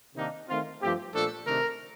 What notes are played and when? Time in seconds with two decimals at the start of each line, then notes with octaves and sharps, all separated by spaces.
0.15 C3 D#3 A#3 D4 D#4
0.48 D#3 A3 C4 F4
0.81 G2 F3 A3 C4 G4
1.13 A#2 F3 A3 D4 A4
1.46 C3 D#3 A3 D4 A#4